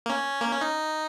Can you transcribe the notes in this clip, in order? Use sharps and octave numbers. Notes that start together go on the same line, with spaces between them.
A#3
C#4
A#3
C#4
D#4